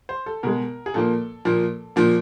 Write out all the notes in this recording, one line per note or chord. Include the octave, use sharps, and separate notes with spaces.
C5
A4
B2 G#3 A#4
G#4
A#2 F3 A#3 A4
A#2 F3 A#3
A#2 F3 A#3